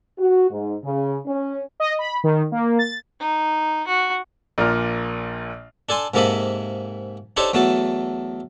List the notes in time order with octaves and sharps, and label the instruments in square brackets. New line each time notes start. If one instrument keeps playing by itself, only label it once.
[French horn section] F#4
G#2
C#3
C#4
[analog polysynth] D#5
B5
D#3
A#3
A6
[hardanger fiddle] D#4
F#4
[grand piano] A#1 A#2 A#4 F6
[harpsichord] D4 A4 G#5 C6
G#2 C3 A#3 A4 D#5 B5
D4 D#4 G4 A4 C5 C#5
E2 F#3 A3 F#4 A5